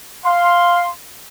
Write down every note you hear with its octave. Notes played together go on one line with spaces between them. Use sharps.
F5 C6